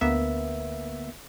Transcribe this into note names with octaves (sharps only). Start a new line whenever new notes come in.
D2 A#3 B3 E5